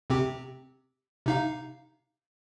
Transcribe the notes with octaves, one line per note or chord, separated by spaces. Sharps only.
C3 C4 G4
C3 D#4 F5